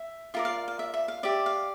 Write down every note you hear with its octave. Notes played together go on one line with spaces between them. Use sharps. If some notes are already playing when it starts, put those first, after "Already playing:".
Already playing: E5
F4 A#4 D5 E5
F5
F5
E5
E5
F5
G4 D5 E5
F5